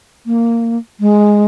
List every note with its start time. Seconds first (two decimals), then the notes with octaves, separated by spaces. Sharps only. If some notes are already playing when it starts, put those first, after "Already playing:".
0.26 A#3
1.00 G#3